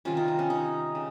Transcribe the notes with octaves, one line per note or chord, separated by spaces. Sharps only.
C3 D#3 G3 C#4 F4
D#4
D#4
C#4
D#4
C#3